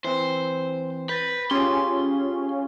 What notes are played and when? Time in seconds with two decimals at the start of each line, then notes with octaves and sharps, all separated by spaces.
0.04 E3 C4 C5
1.09 B4 G6 A6 A#6
1.51 C#4 F4 G4 G#4 C6